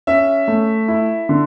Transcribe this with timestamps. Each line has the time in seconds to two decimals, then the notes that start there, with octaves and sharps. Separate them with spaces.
0.07 C#4 E5
0.48 A3
0.88 E4
1.29 D3